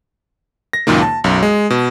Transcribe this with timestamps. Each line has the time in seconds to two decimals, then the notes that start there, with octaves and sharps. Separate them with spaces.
0.73 A#6
0.87 C#2 F#2 A#2 D#3 A#3
1.02 A5
1.24 B1 F#2
1.43 G#3
1.70 B2